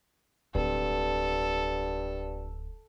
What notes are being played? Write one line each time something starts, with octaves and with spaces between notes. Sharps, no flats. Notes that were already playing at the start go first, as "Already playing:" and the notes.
D1 G2 A4